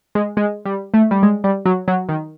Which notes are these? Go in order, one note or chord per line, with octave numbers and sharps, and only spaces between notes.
G#3
G#3
G3
A3
G3
G#3
G3
F#3
F#3
D#3